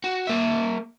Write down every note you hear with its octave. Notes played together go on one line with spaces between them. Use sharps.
F#4
A#3 E5